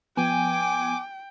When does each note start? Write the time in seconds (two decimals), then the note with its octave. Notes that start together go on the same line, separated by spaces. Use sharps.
0.17 F3 B3 G5 G#5 D6